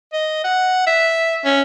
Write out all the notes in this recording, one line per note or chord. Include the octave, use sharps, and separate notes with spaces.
D#5
F#5
E5
C#4